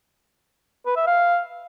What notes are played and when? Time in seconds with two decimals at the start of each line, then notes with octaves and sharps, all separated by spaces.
0.86 B4
0.96 E5
1.07 F5